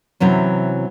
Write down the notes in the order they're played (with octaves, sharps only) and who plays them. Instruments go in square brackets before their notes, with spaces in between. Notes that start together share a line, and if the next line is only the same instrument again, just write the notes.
[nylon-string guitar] C3 E3 F#3 C#4